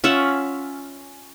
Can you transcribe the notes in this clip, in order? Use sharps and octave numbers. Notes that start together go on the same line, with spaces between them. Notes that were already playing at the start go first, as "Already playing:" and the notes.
C#4 F4 E5 F#5